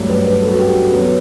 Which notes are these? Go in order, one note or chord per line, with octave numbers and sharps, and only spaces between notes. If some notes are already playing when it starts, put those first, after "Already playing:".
Already playing: G2 F#3 A3
B4
B4
A4
F#4
G4
F#4
F#3 B3 B4